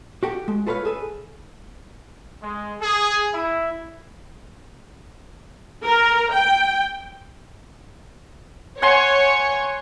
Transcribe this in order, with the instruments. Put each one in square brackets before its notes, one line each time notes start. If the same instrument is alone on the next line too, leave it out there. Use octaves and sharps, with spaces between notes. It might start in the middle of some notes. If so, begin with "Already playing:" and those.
[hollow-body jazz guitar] F#4 G4 A4
G#3
F4 A4 B4 C#5 F5
G#4 A4 B4
[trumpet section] G#3
G#4
E4
[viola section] A#4
G5
[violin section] C#5 [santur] F#5 G#5 C6